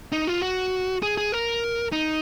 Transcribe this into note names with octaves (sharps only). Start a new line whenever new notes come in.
D#4
F4
F#4
G#4
G#4
A#4
D#4